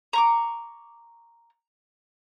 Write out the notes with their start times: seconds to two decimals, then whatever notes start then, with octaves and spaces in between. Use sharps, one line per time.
0.13 A#5 C#6 D6